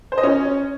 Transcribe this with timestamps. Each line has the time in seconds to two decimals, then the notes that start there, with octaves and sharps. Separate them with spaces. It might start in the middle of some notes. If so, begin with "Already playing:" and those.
0.12 C5
0.18 D#5
0.23 C#4